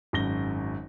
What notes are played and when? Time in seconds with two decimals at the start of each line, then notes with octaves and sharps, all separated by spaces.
0.13 G#1 F#2 A#6 G7